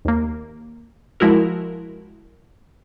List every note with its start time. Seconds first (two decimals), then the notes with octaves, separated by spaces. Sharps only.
0.05 D#2 A#3
1.20 F3 G#3 E4 F#4 A#4